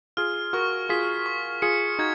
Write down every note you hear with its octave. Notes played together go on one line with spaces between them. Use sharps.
F4 G#4 F6
F#4 A#4 C#6
F4 G#4 B6
C#6
F4 G#4 C#7
D#4 F#4 G#6